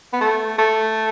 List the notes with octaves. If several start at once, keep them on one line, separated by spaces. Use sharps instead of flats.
B3
A3
A3